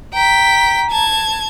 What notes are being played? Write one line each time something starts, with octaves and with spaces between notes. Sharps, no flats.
G5 A#5 B6
A5 G#6